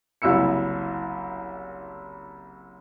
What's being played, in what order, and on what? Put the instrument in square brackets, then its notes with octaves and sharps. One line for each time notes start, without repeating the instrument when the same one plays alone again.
[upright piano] F#1 C2 E4 E6 C#7